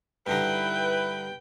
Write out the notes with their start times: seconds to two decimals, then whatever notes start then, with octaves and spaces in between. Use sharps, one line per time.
0.27 G2 D3 D#4 E4 B4 G5